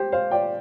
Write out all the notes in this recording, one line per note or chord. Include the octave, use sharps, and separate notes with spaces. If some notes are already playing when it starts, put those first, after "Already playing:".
Already playing: G4 C5
C5 F5
D5 G5